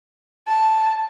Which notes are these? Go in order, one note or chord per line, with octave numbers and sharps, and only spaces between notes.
A5